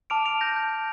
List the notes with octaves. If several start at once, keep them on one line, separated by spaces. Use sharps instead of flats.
A5 D6 F6 D7 F7
D7 F7
G6 A#6
G6